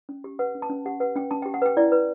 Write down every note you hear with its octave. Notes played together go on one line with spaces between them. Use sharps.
C#4
G4
B4 F#5
C#4
A5
C#4
G4 F#5
B4 F#5
C#4 G5
C#4 A5
G5
G4
F#5
B4 G5
E4 D5
B4